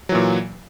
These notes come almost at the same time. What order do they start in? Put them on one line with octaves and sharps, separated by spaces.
F#3 E3 A#2